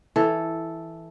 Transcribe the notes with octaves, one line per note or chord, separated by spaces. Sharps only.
E3 A4